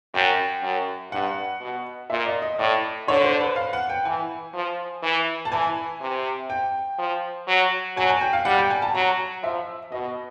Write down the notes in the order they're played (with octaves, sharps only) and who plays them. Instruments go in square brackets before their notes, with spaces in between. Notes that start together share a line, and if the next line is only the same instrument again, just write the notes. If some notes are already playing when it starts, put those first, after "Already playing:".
[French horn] F#2 [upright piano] G5
[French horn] F#2
[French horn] G2 [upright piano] F#5
[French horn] B2
[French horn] A#2 [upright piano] E5
[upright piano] D#5
D#5
[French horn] A2 [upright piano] D5
[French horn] D3 [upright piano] C#5
[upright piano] C5
B4
F5
F#5
G5
[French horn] E3 [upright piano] G#5
[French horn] F3
E3
[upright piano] A5
[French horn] E3 [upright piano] G#5
[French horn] C3
[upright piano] G5
[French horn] F3
F#3
[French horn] F#3 [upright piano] G#5
[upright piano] G#5
G5
F5
[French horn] G3 [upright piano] F#5
[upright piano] G5
G#5
A5
[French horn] F#3 [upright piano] A#5
[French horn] F3 [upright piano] E5
[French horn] B2 [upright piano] D#5